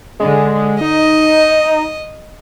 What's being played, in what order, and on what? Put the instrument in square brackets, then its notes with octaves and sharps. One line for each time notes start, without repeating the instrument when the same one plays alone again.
[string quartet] D3 [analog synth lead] G#3
[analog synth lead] D#4 [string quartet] D#5